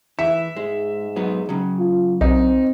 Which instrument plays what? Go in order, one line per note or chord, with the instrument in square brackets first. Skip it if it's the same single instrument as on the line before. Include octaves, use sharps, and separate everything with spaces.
[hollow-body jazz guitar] E3 E4 [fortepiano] E5 [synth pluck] C#7
[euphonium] G#2 [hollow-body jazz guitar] G#3
[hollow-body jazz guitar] F#3 B3 D#4
C#3 F#3
[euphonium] F4
[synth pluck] B1 [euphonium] C4 [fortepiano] D#4